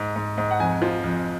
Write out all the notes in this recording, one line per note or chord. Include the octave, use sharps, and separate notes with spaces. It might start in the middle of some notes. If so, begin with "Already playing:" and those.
Already playing: G#2
G#2
G#2
F#5
F2 G#5
F3
F2